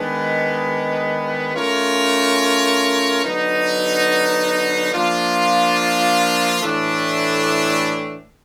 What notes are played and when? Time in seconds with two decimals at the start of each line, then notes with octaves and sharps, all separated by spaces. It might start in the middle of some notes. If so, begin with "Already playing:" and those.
Already playing: D#3 G#3 B3 D4
1.55 A3 C#4 F4 A#4 C#5
3.24 D3 F#3 B3 D#4
4.93 F3 A#3 D4 F4
6.62 A2 E3 A3 D4